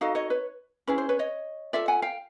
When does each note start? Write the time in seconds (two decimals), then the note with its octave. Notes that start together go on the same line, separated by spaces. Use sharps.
0.01 D#4 F#4 A4 D#5 F5
0.15 C#5 D#5
0.30 B4 C#5
0.87 C#4 E4 G#4 B4
0.98 C5
1.09 B4 C#5
1.19 C#5 D#5
1.73 F4 A4 D5 E5
1.88 F#5 G#5
2.02 F5 G5